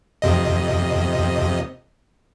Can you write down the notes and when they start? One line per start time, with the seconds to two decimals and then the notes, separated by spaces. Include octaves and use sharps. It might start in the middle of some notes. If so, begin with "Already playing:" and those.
0.22 F2 C3 D#5